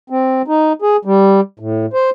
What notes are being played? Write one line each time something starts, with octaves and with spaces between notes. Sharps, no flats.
C4
D#4
G#4
G3
A2
C5